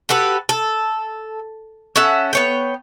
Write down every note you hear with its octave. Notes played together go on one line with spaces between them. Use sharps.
F#4 G4 A4 B4
A4
C#4 A4 E5 F#5
B3 C#5 G5